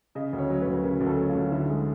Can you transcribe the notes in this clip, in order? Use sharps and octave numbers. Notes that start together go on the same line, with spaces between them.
C#3 D#5
D2
C#5
F#3
D2 B4
C#3 A#4
D2
A4
F#3
F4
D2
D3 E4
G#3